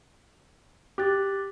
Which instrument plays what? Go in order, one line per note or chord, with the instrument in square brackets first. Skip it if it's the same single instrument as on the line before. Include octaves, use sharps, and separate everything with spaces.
[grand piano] G4 [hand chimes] D6 F#6 A6